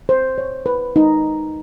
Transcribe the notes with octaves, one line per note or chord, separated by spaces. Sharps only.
C5
C#5
B4
D#4